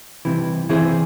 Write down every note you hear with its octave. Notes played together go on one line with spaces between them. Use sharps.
C2 C3 E3
E3 C4 E4 G#4 C5